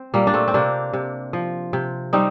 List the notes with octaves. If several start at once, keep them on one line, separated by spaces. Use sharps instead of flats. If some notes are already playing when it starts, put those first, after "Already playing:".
Already playing: C4
A#2 G3 A#3
D4
A3 C4
C4
C3 A#3 D4
C3
F3
C3
G3 C4 D#4